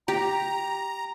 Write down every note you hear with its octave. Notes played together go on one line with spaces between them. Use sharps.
G4 A#5